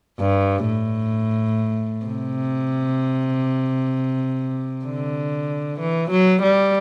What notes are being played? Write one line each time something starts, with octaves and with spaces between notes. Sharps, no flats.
G2
A2
C3
D3
E3
F#3
G3